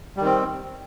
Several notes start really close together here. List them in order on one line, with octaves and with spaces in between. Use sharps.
G3 D#3 C4